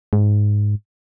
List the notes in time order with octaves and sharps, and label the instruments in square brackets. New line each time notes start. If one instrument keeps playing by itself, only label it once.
[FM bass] G#2